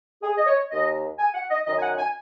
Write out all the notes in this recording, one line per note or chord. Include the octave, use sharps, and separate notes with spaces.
G#4
D#5
C#5
D#2 D#3 D#5
G#5
F#5
D#5
F#2 D#3 D#5
G#5
F#5
G#5